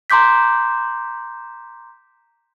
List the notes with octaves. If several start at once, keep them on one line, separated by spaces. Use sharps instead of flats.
A#5 C6 D6 G6 B6